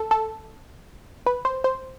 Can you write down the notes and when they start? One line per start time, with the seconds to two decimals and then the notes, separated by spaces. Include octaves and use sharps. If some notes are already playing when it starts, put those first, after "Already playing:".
Already playing: A4
0.11 A4
1.26 B4
1.45 C5
1.64 C5